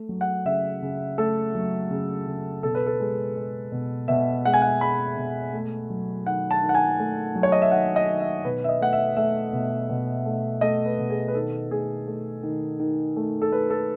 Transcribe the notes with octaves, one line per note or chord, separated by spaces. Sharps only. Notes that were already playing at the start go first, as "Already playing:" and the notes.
Already playing: A3
F#3
F#5
C#3 E5
C#3
A3 A4
F#3
C#3
C#3
B2 A4
B4
A4
G#3
G#3
B2
B2 E5
G#3 F#5
G#5
F#5
G#3 B5
B2
A3
F#3
D#3 F#5
A5
D#3
F#5
G#5
A3
F#3
C#5
D#5
E5
D#3 F#5
D#5
D#3
E5
B2 B4
E5
D#5
A3 F#5
E5
A3 E5
B2
B2
A3
A3 D#5
B4
B2
G#4
B4
D#3 A4
A3 G#4
A3
D#3
D#3
A3
A4
A3 B4
A4